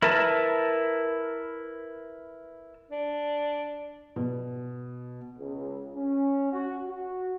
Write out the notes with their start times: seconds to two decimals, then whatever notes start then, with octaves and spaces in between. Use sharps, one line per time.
0.02 E4 A#4 B4 A5
2.91 D4
4.16 B2
5.39 C#2
5.96 C#4
6.53 F#4
6.88 F#4